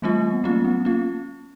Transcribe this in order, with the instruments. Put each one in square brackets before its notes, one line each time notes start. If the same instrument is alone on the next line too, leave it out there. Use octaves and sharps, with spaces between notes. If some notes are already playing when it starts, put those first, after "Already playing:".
[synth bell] E3 G3 C4 F4 [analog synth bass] A3
[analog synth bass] B3
[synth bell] F#3 A3 C#4 F4 [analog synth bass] A#3
[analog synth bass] B3
[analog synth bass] A#3 [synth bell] C#4 F4